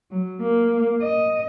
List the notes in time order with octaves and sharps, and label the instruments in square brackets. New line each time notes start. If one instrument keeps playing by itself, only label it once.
[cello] F#3
A#3
D#5